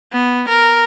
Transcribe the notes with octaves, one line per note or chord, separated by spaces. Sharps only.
B3
A#4